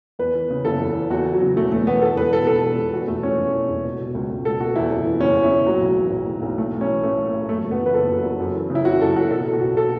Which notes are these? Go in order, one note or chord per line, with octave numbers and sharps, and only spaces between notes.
E2 B4
E3
C#3
F#1 A4
E2
E3
E2 F#4
E3
F#3
C#3
E1 A3
E2 A3
E3 B3
E2 A4
E1 B4
B2 A4
E1 A4
E2
E1
E2 F#4
E1 A3
E3 C#4
E1
E2
E1
B2
B2
C#2
C#2
B2 A4
B2 F#4
E2 E4
F#1
E3
F#1 C#4
E2
E4
F#1
A2 F#3
B1
E3
B1
A2
B1
A2 A3
A1
C#4
E3
A1 A3
A2
A1
F#2 A3
F#1
B3
E3
B4
F#1 A4
F#2
F#1
F#2
E3
C#3
E4
F#1 F#4
F#2 A4
E3 F#4
B2 A4
B2
F#4
B1
A4